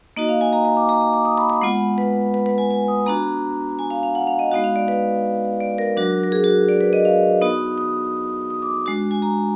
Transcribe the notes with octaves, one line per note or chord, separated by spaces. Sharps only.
A#3 D#4 F#4 D#5
F5
G#5
A#5
A#5
D6
A#5
A#5
D6
D#6
B5
B5
G#3 B3 F4 F#5
B4
B4
B4
G#5
G#5
D#6
B3 D4 F#4 A#5
G#5
F5
F5
F#5
F5
D#5
G#3 B3 D#4 F#4 F5
F5
D5
B4
D5
A#4
F#3 D4 F#4
A#4
G#4
F#4
D5
B4
D#5
F5
B3 D#4 F#4 D#6
D#6
D#6
D6
G#3 D4 F#4
G#5
A#5